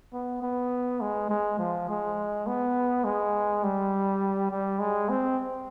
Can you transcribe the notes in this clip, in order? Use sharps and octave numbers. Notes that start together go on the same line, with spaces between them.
B3
B3
G#3
G#3
F3
G#3
B3
G#3
G3
G3
G#3
C4